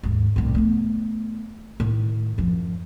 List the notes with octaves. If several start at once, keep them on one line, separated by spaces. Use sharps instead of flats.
D#2 G#2
C2 A2
A3 B3
A2 D#3
F#2 F3